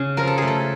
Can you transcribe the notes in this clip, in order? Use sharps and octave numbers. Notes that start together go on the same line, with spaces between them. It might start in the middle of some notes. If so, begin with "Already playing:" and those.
Already playing: C#3 G#4
F3 A#4
A4
A3 G#4
A4